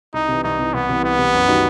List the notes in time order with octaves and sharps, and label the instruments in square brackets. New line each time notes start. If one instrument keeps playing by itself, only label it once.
[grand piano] C2 [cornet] D#4
[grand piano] C3 E3
[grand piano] C2 [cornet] D#4
[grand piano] C3 E3
[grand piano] C2 [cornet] B3
[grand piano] C3 E3
[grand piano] C2 [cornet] B3
[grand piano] C3 E3
F#2
D#3 G3 D#4 F#4